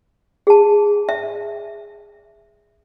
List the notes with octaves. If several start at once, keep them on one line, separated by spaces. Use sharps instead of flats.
G#4 A5
E5